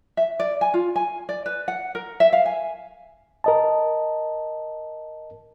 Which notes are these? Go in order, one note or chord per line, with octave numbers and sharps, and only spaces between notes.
E5
D5
G#5
F4
G#5
D5
B4
F#5
A#4
E5
F5
G#5
A#4 D#5 A5